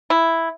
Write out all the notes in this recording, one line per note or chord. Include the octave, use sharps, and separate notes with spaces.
E4